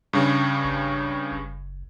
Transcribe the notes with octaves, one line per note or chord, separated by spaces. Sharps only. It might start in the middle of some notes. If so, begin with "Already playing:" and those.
G2 C#3
G#1
F#1